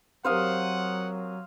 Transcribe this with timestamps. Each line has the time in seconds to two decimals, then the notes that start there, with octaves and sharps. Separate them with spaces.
0.25 F#3 C4 G4 A#4 C5 F5 F#5 D#6